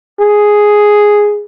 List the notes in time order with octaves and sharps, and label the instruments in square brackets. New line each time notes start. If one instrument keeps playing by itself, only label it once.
[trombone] G#4